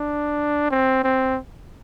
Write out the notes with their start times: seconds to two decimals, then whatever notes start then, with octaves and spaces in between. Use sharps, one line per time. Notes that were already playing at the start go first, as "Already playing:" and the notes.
Already playing: D4
0.71 C4
1.04 C4